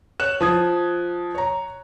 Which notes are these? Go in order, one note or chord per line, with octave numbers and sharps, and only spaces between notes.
C#5 F#6 E7
F3 D#6 G#6
C#5 A#5